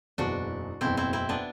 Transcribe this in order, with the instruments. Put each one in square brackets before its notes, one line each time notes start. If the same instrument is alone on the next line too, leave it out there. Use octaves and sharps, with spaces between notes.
[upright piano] F#1 E2 B2 [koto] D4 F#4
[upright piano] F#1 E2 B2 [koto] C4 E4
[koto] C4 E4
C4 E4
B3 D4